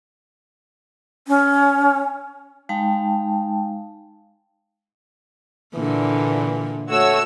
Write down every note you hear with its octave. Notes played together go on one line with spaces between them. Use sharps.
C#4
G#3 D#4 F5 G5 A5
A#2 D3 E3
A3 F#4 C#5 E6